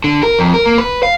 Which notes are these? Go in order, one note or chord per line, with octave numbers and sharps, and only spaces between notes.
D3
A#4
F2
A#4
A#3
B4
F5